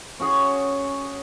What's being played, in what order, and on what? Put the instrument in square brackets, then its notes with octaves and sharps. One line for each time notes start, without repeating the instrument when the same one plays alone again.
[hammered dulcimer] C#4 F#4 G#4